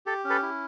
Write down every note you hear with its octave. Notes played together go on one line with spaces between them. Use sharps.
G4 A4
C#4
A4 B4
E4